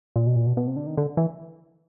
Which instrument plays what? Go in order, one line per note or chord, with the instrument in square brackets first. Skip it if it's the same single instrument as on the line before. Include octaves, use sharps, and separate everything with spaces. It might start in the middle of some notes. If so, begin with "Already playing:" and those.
[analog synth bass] A#2
B2
A#2
B2
B2
C3
D3
D#3
D3
E3